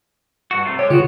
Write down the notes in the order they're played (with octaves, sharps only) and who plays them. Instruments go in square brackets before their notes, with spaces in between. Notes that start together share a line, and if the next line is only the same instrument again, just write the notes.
[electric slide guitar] G2 F#4
C3 A3 F4
[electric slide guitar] G#3 G4 [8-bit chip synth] C#5
[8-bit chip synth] C#3 F4 [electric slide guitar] B3 F#4